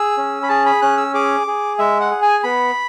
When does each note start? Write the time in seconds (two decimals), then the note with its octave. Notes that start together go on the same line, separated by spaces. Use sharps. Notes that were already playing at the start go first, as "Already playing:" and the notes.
Already playing: G#4 E6
0.17 C#4
0.43 B5
0.49 G#4 A5
0.66 B5
0.82 C#4 F#6
0.97 E6
1.14 G#4 D6
1.47 G#4
1.79 G#3 E5
2.01 F#5
2.11 G#4
2.22 G#5
2.43 B3 B5